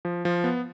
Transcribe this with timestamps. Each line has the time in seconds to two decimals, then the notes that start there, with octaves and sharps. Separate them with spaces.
0.05 F3
0.25 F3
0.44 B3